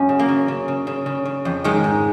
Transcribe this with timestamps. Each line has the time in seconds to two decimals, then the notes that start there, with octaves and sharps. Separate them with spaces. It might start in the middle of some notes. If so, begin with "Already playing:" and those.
Already playing: F#2 C#4
0.09 C#3
0.19 A#3
0.29 C#3
0.48 C#3
0.68 C#3
0.87 C#3
1.06 C#3
1.25 C#3
1.45 F2
1.64 D#3 G#3
1.84 G#2